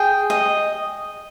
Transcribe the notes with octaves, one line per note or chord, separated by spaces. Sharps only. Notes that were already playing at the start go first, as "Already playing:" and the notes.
Already playing: G#4 G5
D#5